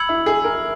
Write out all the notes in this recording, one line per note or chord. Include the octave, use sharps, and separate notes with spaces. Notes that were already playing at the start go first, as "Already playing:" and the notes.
Already playing: B5 E6 G#6 C#7 F#7
E4
G#4
A#4